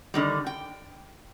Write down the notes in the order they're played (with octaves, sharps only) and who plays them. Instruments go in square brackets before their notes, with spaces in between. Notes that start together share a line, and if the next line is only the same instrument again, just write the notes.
[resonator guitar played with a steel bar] D3 D#3 G3
G5